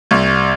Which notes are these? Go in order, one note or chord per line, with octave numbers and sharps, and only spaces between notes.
C2